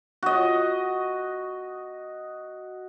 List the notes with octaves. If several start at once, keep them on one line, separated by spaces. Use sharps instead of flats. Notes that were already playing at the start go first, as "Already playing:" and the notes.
F#4 D#5